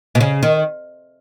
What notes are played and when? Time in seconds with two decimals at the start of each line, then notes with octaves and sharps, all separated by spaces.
0.15 B2
0.20 C#3
0.43 D#3